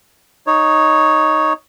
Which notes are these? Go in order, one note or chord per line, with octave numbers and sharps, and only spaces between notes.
D#4 C#5